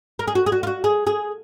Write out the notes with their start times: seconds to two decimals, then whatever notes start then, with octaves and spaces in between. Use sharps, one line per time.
0.19 A#4
0.27 G#4
0.35 F#4
0.46 G#4
0.52 F#4
0.63 F4
0.67 F#4
0.84 G#4
1.07 G#4